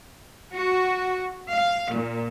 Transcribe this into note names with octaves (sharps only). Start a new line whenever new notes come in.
F#4
F5
A#2